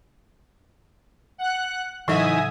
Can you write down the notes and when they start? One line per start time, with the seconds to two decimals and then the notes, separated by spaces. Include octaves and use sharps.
1.38 F#5 F#6
2.08 A2 C#3 E3 F#3 D#4 E5 G#5 D#6